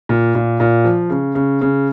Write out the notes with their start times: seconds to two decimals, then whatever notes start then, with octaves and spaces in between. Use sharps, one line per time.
0.09 A#2
0.35 A#2
0.60 A#2
0.84 F3
1.10 C#3
1.35 C#3
1.61 C#3